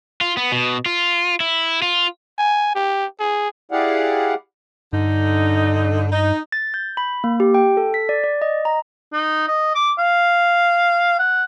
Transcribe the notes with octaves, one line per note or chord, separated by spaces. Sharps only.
F4
B3
B2
F4
E4
F4
G#5
G4
G#4
E4 G4 G#4 D5 F5 F#5
G2 D3 D#4
D#4
A6
G6
B5
A#3
G4
G5
A4
B6
D5
D5
D#5
A#5
D#4
D#5
D6
F5
F#5